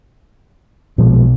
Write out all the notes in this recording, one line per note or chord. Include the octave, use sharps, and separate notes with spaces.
B1 A#2 F3 G#3